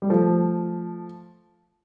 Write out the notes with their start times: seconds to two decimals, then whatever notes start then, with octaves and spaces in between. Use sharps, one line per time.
0.02 G3
0.09 F3 A3